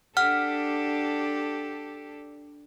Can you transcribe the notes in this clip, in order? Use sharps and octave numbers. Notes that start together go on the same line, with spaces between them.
D4 G4 A4 F#5 F6